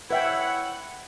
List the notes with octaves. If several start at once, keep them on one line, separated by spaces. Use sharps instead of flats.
E4 B4 C#5 E5 F#5 G5